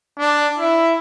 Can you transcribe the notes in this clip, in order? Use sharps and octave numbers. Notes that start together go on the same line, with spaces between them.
D4
E4